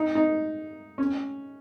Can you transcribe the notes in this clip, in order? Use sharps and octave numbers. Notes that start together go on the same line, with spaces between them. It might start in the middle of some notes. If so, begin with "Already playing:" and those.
Already playing: D#4
D#4
C#4